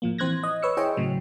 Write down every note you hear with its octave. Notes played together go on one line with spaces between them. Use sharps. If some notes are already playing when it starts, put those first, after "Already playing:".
A2 F3 A#3
E3 C4 C5 F#6 G#6 A#6
D#5
B4 C#5 E6 C#7
E4 G#4 C5 C#5 D#5 G5
A2 C#3 F#3